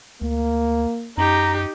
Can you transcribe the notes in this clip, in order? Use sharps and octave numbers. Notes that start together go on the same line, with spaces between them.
D2 A#3
F#2 D#4 G4 A#5